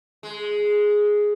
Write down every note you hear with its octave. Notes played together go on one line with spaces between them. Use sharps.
G#3